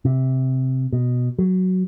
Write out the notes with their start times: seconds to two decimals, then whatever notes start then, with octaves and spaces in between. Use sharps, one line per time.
0.05 C3
0.93 B2
1.39 F#3